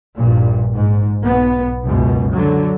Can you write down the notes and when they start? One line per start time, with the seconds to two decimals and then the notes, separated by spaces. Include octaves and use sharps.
0.15 A#1 G2 A#2
0.74 G#2
1.22 B1 B3
1.84 C#2 F#2 B2
2.32 D3 F#3